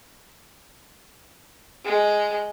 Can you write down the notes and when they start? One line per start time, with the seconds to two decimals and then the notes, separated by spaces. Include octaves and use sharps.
1.84 G#3